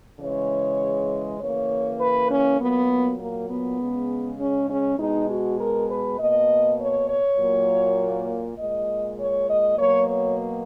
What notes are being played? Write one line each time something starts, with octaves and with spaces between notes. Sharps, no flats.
C#3 E3 G#3 C#5
C#3 E3 A#3 C#5
B4
C#4
A#2 F#3 A#3 B3
A#3
B3
C#3 G#3
C#4
C#4
B2 G#3 D#4
F#4
A#4
B4
B2 A#3 D#5
C#5
C#5
A#2 F#3 A#3
A#2 G#3 D#5
C#5
D#5
B2 F#3 A#3 C#5
C#5